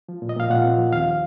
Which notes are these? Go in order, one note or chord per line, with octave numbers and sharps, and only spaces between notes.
F3
A#2
D#5
A#2 F5
A#2 F#5
C4
F3
D#2 F5